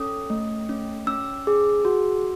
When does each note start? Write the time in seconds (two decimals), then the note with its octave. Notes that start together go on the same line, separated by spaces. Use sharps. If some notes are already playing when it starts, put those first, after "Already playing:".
Already playing: C#4 A4 D#6
0.30 A3
0.69 C#4
1.07 C#4 E6
1.47 G#4
1.85 F#4